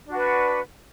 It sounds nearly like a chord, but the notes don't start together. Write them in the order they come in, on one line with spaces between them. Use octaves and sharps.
D4 F#4 B4